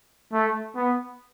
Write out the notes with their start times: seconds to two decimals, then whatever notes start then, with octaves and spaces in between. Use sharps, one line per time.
0.33 A3
0.76 B3